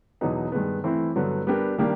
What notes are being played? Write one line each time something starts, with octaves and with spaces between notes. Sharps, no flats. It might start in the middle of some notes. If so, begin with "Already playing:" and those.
E2 B2 F#3 B3 D#4
G2 D#3 G#3 B3
E3 A3 C4 E4
G2 D3 F#3 B3
G3 B3 D4 G4 A#4
D#3 G3 A#3 D4 G4